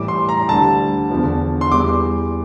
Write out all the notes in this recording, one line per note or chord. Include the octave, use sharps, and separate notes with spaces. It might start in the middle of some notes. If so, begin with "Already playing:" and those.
Already playing: A2 E3 G3 D6
C6
A#5
D2 D3 G3 A5
E2 D3 F3
C6
E2 E3 G3 D6